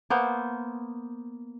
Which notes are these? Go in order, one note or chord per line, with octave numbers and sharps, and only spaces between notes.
A#3 B3 C5